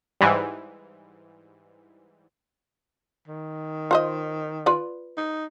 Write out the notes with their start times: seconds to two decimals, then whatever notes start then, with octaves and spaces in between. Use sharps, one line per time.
0.21 G#2 E3 G3
3.27 D#3
3.91 F4 C5 D#5
4.66 F4 B4 D5
5.18 D#4